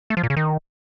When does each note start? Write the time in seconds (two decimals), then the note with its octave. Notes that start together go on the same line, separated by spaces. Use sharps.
0.10 A3
0.17 F3
0.23 A#2
0.30 C#3
0.37 D#3